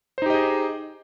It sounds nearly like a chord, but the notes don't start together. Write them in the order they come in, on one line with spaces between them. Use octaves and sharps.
C5 D#4 G4 D#5 G#4